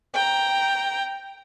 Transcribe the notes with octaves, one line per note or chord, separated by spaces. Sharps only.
G5 A#5